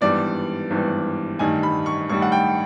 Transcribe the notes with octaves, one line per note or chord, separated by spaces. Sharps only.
G#1 G2 E3 G3 B3 D5
G#1 G2 E3 G3 B3
A1 G2 D#3 G3 G#5
B5
C#6
A1 G2 D#3 G3 C#6
F#5
G5